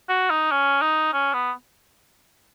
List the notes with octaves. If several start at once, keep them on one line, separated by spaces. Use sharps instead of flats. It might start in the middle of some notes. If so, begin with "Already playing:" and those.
F#4
D#4
C#4
D#4
C#4
B3